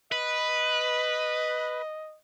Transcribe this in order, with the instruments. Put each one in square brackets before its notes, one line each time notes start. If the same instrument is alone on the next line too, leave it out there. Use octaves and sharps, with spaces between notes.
[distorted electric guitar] B4 [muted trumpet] D#5